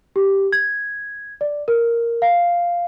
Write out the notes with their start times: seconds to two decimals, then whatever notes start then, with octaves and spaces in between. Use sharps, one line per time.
0.16 G4
0.52 G#6
1.41 D5
1.68 A#4
2.22 F5